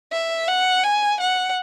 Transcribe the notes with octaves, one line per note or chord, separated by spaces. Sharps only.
E5
F#5
G#5
F#5